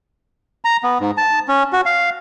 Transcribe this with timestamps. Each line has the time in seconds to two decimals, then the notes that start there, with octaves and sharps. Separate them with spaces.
0.65 A#5
0.83 B3
1.00 G#2
1.17 A5
1.48 C#4
1.73 F#4
1.86 F5